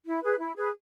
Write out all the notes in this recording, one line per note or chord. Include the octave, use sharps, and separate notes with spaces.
E4
G#4 B4
E4
G#4 B4